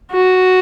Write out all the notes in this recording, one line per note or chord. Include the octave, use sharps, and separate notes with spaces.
F#4